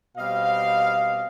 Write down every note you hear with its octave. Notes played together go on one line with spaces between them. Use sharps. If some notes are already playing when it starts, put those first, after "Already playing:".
B2 G3 C4 D#5 F5